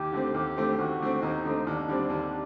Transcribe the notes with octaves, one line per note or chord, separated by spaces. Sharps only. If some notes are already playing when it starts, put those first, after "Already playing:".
Already playing: D#2 G4
D3 A3 C4
D#2 G4
D3 A3 C4
D#2 F#4
D3 A3 C4
D#2 D#4
D3 A3 C4
D#2 D4
D3 G3 C4
D#2